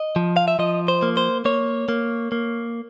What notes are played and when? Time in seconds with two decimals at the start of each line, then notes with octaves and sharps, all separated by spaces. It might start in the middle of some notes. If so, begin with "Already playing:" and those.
Already playing: D#5
0.16 F3
0.37 F5
0.48 E5
0.59 F3 D#5
0.88 C5
1.02 A#3
1.17 C5
1.45 A#3 C#5
1.89 A#3
2.32 A#3